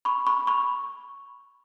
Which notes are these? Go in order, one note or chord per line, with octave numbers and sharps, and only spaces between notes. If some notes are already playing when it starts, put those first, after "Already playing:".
B5 C#6
B5 C#6
B5 C#6